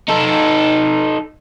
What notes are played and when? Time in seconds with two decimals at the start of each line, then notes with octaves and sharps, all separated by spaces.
0.08 D#4 A4